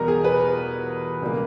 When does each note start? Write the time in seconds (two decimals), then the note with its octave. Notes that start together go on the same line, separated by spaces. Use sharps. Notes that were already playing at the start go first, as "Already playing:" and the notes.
Already playing: E2 B2 G3 B3 A#4 A#5
0.08 G#4
0.24 B4
1.21 C#2 B2 G3 A#3